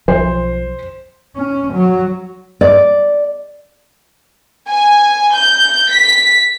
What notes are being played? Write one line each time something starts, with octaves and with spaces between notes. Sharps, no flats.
B1 F3 F#3 C5
C#4
F#3
D5
G#5
G6
B6